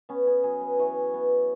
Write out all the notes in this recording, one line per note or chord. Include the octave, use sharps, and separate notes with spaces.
B3 C#4
G#4
F#3 G#4
B4
E3 C#5
B3